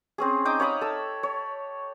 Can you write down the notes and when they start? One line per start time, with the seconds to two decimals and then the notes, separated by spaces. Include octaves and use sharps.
0.18 C4 C#4 G#4
0.45 D#4 G5 D6 D#6
0.60 C#5 F5 B5 D#6
0.81 A4 E6
1.23 C#5